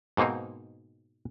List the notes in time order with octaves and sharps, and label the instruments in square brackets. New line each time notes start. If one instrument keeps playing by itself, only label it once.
[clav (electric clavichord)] G#2 B2 A#3 C4 D#4